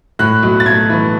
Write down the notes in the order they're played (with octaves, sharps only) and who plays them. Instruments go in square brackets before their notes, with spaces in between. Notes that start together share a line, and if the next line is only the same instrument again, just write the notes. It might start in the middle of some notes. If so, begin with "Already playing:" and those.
[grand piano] A2 F#6
B1
A6
A3 G#6
E3